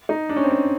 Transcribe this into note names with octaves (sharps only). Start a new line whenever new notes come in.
D#4
D4
C#4
C4
C#4